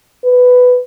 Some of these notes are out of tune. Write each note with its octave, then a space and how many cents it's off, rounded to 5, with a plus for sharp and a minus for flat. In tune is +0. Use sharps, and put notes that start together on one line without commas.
B4 +10